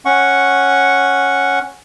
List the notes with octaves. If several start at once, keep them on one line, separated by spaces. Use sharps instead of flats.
C#4 F#5 C#6